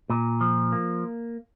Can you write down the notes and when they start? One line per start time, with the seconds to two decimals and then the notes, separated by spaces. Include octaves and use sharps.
0.10 A#2
0.41 F3
0.72 A#3